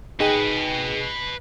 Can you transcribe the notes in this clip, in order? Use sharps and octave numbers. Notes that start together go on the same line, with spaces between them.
D#4 G#4 B4 D#5 G5